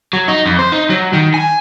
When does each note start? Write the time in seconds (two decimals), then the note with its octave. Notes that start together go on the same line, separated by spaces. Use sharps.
0.13 F#3
0.28 D#4
0.46 F2
0.59 C5
0.72 D#4
0.90 F#3
1.13 D#3
1.34 G#5